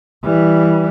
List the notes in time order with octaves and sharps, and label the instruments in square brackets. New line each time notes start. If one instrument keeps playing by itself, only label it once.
[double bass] E3 G3